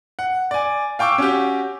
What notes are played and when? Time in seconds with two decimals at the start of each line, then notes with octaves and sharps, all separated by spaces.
0.19 F#5
0.51 D5 G#5
0.99 F5 G5 C#6 D6 E6
1.18 C#4 F#4 G4